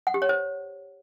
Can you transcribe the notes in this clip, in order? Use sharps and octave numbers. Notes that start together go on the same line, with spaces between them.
F#5
G4
C#5
C5